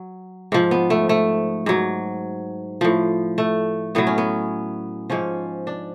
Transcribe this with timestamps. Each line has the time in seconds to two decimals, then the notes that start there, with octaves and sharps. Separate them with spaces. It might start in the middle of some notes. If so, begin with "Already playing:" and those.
Already playing: F#3
0.52 G#2 F3
0.71 B3
0.90 A3
1.09 A3
1.66 G#2 F#3
2.81 A2 F3
3.38 A3
3.95 A2 F#3 B3
4.07 C#4
4.18 B3
5.10 G#2 F3 C#4
5.67 D4